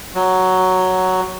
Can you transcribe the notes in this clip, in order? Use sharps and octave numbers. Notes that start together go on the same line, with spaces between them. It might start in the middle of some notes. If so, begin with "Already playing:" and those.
F#3